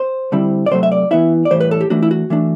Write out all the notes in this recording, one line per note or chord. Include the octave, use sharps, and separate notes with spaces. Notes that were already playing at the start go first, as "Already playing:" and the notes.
Already playing: C5
D3 G3 C4 E4
D5
C3 F#3 A3 C5
E5
D5
E3 B3 E4 E5
D5
A2 E3 G3 C5
B4
A4
G4
E3 A3 D4 F#4
E4
F#4
E3 A3 D4